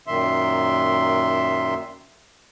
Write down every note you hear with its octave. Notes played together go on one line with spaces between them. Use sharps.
F#2 A#2 D#3 E5 C6